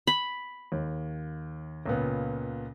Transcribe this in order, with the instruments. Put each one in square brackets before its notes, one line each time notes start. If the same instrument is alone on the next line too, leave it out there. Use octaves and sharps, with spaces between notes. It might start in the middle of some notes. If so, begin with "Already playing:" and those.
[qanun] B5
[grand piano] D#2
C#2 A#2 B3